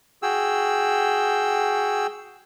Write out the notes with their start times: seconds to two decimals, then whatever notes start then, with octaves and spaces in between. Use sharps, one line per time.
0.22 F#4 G#4 G5 E6